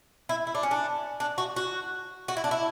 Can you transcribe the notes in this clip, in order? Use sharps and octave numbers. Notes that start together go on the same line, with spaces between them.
E4
E4
D4
C#4
D4
D4
F#4
F#4
F#4
E4
D4
E4